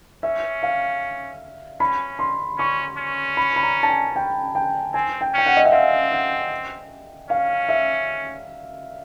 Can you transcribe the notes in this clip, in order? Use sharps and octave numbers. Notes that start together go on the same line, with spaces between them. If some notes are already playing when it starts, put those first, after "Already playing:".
C#4 E5
F5
C#4 B5
C6
C#4 C#6
C#4
B5
B5
A#5
A5
G#5
G5
G5
C4 G#5
G5
C#4 G5
F#5
D#5
E5
C4 F5
F#5
C#4 F5
E5